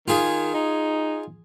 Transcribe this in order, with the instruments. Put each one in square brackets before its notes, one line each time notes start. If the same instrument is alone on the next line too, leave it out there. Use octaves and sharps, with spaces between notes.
[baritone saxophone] D#3 [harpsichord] F4 G#4
[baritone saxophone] D#4